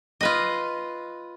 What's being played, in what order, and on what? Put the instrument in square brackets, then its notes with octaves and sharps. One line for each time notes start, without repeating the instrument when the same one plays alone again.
[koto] F4 B4 D#5